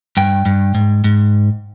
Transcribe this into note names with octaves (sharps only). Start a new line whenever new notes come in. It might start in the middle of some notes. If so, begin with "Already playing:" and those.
G2 G5
G2
G#2
G#2